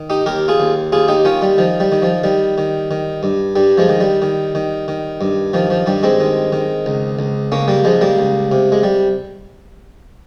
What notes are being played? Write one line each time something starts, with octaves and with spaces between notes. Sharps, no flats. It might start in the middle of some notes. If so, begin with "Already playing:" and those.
Already playing: D#3
D#4 G4
D#2 G4 A#4
F4 G#4
D#2
D#2 F4 G#4
D#4 G4
D#3 C#4 F4
G3
D#3 F3
G3
D#3
F3
D#3 G3
D#3
D#3
G2
G2 G3
F3 G#3
D#3
G3
D#3
D#3
D#3
G2
D#3 F3
F3
G2 G3
G#3 C4
D#3
D#3
C#2
C#2
C#2 A#3 C#4
G3 A#3
C#2 F3 G#3
G3 A#3
C#2
C3
G#3
G3